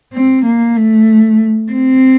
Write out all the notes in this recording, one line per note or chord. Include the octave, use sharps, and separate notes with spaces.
C4
A#3
A3
C4